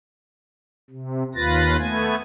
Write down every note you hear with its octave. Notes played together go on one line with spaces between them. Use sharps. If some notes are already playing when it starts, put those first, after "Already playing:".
C3
D#2 F4 B4 A6 A#6
A3 B3 G#5